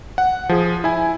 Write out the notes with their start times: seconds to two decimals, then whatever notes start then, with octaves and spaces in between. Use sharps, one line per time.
0.18 F#5
0.49 F3 G#4
0.84 E4 G#5